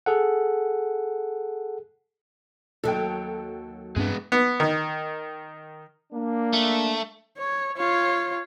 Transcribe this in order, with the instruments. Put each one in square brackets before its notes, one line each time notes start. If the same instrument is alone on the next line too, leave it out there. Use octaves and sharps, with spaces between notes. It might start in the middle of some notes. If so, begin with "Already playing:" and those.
[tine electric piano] G#4 A4 F#5
[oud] D#2 F#3 [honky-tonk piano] A4 G5
[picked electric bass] G2 C4 D4 [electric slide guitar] G#3 B3
[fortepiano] B3
D#3
[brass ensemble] A#3 D4
[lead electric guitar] A3
[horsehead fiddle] C#5
F4 C#5